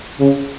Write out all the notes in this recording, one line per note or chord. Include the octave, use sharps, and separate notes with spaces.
C#3